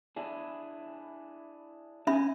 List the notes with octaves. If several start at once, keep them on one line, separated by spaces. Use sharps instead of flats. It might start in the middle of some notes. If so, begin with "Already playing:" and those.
D4 E4 G#4
C4 C#4 E5 G#5 B5